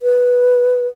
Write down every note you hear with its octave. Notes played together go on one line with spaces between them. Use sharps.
B4